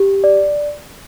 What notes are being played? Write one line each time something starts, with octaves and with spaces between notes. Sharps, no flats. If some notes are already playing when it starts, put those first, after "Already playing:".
Already playing: G4
D5